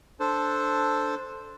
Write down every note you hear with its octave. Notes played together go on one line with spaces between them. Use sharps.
D4 A4 C5